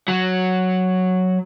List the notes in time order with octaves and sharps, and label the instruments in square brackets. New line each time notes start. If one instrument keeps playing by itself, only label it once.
[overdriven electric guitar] F#3